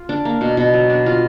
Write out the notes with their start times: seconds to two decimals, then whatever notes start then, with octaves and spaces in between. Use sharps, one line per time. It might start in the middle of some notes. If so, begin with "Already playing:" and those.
Already playing: F4
0.09 D4
0.25 A#3
0.41 B2
0.57 B2
0.73 F#3
0.90 D4
1.06 F4